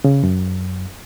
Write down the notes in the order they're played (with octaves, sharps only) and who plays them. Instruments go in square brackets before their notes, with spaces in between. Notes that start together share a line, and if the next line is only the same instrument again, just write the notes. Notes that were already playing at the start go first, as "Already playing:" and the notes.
[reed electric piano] C#3
F#2